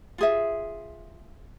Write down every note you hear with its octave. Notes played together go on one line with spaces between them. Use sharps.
F4 G#4 E5